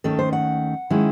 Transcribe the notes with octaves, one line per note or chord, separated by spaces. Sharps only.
D#2 D#3 A3 C#4 A4
C5
F#5
D#3 G#3 C#4 E4